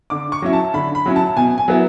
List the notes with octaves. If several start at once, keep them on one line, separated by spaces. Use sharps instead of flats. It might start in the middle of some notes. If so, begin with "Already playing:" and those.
D3 D6
C#6
F#3 C#4 E4
A5
D3 B5
B5
F#3 C#4 E4
A5
B2 G#5
G#5
F#3 B3 E4